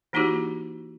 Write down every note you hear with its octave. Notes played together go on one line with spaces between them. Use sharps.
E3 A#3 D#4 E4 F#4 G4